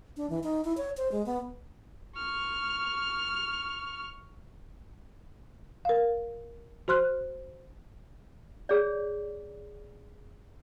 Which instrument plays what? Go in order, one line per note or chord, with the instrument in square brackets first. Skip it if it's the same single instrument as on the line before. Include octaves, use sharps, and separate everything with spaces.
[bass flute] D4
E3
D#4
E4
C#5
C5
G#3
B3
[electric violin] C#6 F6
[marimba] A#4 F5
F#4 C5 C6 F6 F#6
[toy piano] G#4 C#5 D5